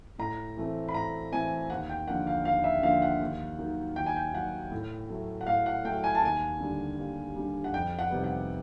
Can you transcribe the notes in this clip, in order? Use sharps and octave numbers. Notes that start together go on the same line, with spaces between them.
A2 A#5
E3 A3 C4
B5
A2 A#5
E3 A3 C4 G#5
D#2 F#5
G5
D3 F3 A#3 F#5
F5
D#2 F5
E5
D3 F3 A#3 F5
F#5
D#2
D#3 F#3
D#2 G5
G#5
G5
D#3 F#3 F#5
A2
F#3 A3
F#5
A2 F5
F#5
F#3 A3 G5
G#5
A5
D#2 G#5
D3 G3
D#2
D3 G3
F#5
F2 G5
F#5
C3 D#3 G3 B3
F#5